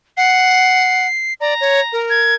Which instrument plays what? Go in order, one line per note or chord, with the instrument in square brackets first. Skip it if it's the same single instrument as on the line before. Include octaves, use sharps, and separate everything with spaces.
[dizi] F#5 [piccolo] C7
[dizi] D5 [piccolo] A#5
[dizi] C#5
A#4
[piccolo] G#6